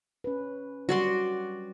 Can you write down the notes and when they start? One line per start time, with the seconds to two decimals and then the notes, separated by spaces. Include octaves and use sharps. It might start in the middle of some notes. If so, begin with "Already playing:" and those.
0.24 C#4 B4
0.89 F#3 G3 F#4 D5 C6